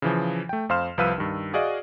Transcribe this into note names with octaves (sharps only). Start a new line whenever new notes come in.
C#3 E3 F3
A3 G5
F2 C5 F5 C6 F6 E7
C2 F3 B4 F5 E6 D#7
G2 D#3
F#4 G#4 D5 D#5 F5